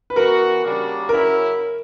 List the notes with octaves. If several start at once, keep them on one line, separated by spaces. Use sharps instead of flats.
B4
E3 B3 F#4 A#4
C#3 G3 A#3 D4 F#4
C#3 F#3 C#4 E4 A#4